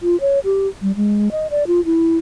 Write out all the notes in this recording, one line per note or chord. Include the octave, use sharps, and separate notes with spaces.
F4
C#5
G4
G3
G#3
D#5
D5
F4
E4